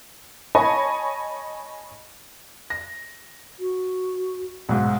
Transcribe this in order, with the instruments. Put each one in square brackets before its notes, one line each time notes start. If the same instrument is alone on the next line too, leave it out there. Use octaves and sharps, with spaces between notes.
[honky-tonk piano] C#5 D#5 G#5 A5 B5 C#6
[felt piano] A#6
[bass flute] F#4
[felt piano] B1 G#2